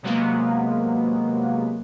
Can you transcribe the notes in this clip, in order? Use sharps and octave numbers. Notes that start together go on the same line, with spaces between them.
C3 F#3 G#3 A#3 B3